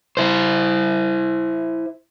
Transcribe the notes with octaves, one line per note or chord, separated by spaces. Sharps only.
E4 C5